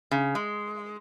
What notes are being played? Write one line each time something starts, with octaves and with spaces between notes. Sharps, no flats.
C#3
G#3